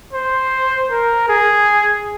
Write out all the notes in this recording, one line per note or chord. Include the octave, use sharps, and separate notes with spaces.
C5
A#4
G#4